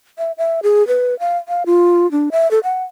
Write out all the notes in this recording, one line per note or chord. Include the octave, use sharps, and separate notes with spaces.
E5
E5
G#4
B4
F5
F5
F4
D4
E5
A4
F#5